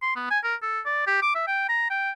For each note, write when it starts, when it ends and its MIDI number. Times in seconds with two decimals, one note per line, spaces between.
0.02 0.13 84
0.16 0.26 59
0.31 0.39 80
0.44 0.55 70
0.62 0.80 69
0.85 1.06 74
1.07 1.21 67
1.22 1.31 86
1.35 1.47 76
1.47 1.65 79
1.69 1.88 82
1.90 2.11 79